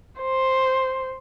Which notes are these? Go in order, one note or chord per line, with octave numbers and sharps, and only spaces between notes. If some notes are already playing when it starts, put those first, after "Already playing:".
C5